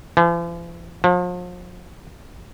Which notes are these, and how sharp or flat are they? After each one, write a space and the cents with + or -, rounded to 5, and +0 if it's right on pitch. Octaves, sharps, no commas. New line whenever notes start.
F3 -45
F3 +40